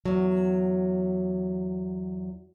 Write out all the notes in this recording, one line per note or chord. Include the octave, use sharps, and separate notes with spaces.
E2 F#3